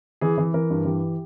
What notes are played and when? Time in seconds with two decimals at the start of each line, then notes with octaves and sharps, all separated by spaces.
0.21 E3 G#4
0.38 E3
0.54 E3 A#4
0.70 G2
0.85 E3 G4